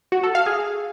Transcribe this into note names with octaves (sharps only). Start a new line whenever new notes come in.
F#4
A4
F5
G#4